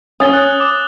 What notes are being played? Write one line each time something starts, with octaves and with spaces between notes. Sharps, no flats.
C#4 D#6 A6 G7
F#6
D6